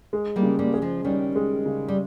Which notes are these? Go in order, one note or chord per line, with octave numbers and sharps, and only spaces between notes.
G#3
G3 A#3
C#3
G3 A#3
G#4
F3 G#3
D#3 G3 C#4
G#3
C#3
G3